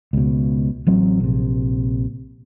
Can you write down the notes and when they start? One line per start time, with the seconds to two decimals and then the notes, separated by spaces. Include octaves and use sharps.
0.13 C#2 B2
0.87 A1 F#3 C4
1.20 A#1 C3